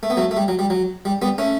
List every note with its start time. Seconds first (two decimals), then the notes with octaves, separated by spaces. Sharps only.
0.03 A3
0.10 B3
0.17 F#3 A3
0.31 A3
0.37 G3
0.48 F#3
0.59 G3
0.70 F#3
1.05 G3
1.22 G3 B3
1.38 A3 C#4